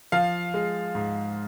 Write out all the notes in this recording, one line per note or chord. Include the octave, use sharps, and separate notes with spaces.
F3 F5
G#3
G#2